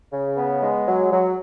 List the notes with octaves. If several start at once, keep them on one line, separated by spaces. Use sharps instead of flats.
C#3
B3
G#3
F#3
F#3